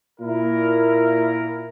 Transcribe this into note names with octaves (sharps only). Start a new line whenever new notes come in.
A#2 E4 A#4